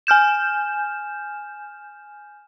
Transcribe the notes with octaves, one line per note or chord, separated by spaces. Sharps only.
G#5 F6 G6 E7